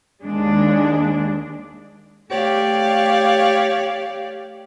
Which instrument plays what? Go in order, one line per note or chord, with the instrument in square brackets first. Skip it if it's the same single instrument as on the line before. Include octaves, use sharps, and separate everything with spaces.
[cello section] D#2 G#3 D4
[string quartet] A3 G4 C#5 D5 F5